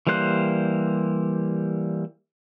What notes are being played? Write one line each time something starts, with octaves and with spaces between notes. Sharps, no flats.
E3 G3 A#3 C5 F#6